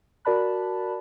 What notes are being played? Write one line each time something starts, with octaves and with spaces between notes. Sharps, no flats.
F#4 A#4 D5 A5 B5 F#6